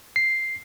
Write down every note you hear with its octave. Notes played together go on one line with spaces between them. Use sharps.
C7